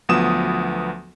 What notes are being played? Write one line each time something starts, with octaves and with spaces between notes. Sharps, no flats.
D2 F3 F#3 B3 D#6 E7